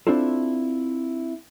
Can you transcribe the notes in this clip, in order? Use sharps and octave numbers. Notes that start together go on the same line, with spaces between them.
C4 D4 E4 F4 A4